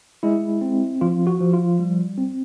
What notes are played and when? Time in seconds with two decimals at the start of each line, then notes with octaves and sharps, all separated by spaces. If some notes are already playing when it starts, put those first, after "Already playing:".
0.23 G#3 E4
0.61 C4
1.01 F3 F4
1.27 F#4
1.41 F3
1.53 F4
1.79 G3
2.18 C4